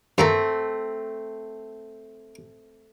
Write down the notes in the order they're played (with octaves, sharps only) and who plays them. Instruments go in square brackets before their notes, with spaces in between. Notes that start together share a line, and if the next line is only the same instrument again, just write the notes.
[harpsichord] G2 A#3 A#5 [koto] A3 C4